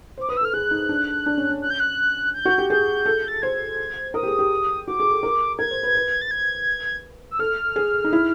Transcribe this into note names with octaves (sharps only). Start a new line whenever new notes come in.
C5 D6
B4 D#6
E6
A4
F6
G#4 F#6
D#4
D4
D4
C#4
C#4
F#6
G6
F#6
G6
F#4
G4
G#4 G6
A4
A6
C5 G#6
A#4 D#6
G4
G#4
G4
F#4 D6
G#4
A4
A#4
A#4 G#6
C5
B4
B4
A6
G#6
E6
A4 F6
G#4
D#4
E4